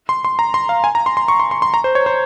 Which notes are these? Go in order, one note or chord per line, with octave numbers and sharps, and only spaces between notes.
C6
C6
A#5
C6
F5
G#5
A#5
C6
C6
C#6
C6
C6
C6
A#5
C5
C#5
C5